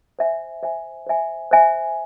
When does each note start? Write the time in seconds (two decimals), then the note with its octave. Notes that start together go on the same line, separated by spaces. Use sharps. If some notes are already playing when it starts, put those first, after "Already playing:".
0.19 C5 E5 G#5
0.63 C5 E5 G#5
1.07 C5 E5 G#5
1.51 C5 E5 G#5